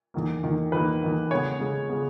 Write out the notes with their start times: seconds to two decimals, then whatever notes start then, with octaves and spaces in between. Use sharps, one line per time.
0.14 E2 D#3 A#3
0.43 E2 D#3 A#3
0.72 E2 D#3 A#3 B4
1.02 E2 D#3 A#3
1.31 C#3 G#3 B3 C#5
1.60 C#3 G#3 B3
1.89 C#3 G#3 B3